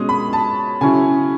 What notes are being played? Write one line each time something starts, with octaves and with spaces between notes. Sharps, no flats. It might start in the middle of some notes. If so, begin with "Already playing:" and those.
Already playing: B2 G#3 C#4 D#6
B5
A5
C#3 F#3 C#4 E4 G#5